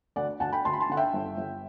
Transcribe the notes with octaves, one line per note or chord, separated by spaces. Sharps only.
D2 D5 F#5
D2 F#5 A5
G5 B5
D2 A5 C6
B5
A5 C6
D3 F#5
E5 G5
G1
G1